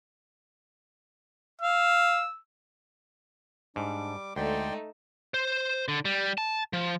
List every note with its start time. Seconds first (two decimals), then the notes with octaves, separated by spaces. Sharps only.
1.62 F5 E6
3.76 G#2 G3 D4 D6
4.36 D2 G#3 A3 D#4 D5 G5 C6
5.34 C5
5.88 D3
6.05 G3
6.38 A5
6.73 F3